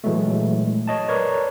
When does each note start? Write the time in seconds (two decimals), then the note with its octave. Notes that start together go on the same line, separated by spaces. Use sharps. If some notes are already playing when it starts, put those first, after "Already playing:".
0.04 A#2 E3 F#3 G#3 A3
0.88 C#5 D#5 A5
1.08 A#4 B4 C#5 D5